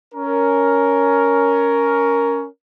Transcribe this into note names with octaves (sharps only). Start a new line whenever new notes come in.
C#4 A#4